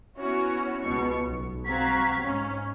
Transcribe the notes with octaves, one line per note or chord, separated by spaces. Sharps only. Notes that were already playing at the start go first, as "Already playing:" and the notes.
B3 C#4 E4 F#4 C#5
C#2 B2 B3 C#6
B1
C4 F#4 F5 A#5 G#6 B6
G#2 C#4